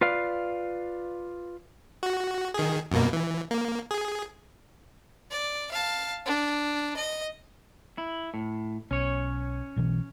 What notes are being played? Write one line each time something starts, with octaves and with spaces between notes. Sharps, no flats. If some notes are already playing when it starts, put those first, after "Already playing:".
F4 B4 D5 F5
F#4
D#3 G#4
F#2 B2 A#3
E3
A#3
G#4
D5
F5 A5
D4
D#5
E4
A2
B1 C#4 C#5
B1 B2 E3